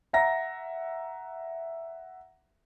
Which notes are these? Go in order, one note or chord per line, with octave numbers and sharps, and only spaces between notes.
E5 F#5 A#5 A#6